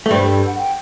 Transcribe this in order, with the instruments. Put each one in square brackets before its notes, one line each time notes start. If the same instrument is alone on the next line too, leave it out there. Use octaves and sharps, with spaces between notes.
[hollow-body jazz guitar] A3
[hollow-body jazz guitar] G2 G3 [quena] C5
[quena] A4
A4
F#5
G5